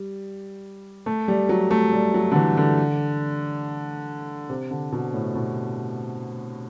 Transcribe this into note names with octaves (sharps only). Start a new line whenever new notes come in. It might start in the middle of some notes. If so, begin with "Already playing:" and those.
Already playing: G3
A3
G3
F#3
A3
G3
F#3
D3
E3
D3
C3
D3
B2
A2
B2